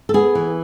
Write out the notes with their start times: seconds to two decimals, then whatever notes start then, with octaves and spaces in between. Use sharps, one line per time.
0.09 A4
0.14 B3 G#4
0.35 E3